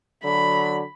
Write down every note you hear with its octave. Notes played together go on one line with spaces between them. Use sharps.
D3 F#3 B5